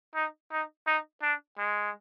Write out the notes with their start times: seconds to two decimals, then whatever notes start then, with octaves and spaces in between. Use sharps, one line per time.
0.15 D#4
0.52 D#4
0.87 D#4
1.22 D4
1.58 G#3